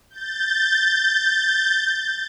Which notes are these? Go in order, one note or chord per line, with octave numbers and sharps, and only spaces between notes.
G6 A6